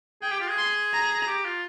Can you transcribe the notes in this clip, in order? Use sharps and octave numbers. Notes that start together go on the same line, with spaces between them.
G#4 G5
G4
F4
G#4
C6
A#5
G4
F4